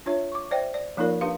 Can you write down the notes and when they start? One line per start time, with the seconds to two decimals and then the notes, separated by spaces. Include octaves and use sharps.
0.06 D4 F4 C#5 E5
0.32 C#6 D6
0.51 C5 D5 E5 G5
0.74 D5
0.97 F3 A#3 D#4 F4 A#4 D5
1.21 D4 G4 B4 F5 C6